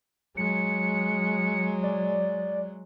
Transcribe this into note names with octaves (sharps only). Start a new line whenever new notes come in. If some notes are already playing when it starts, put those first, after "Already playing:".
F#3 G#3 C#7
D5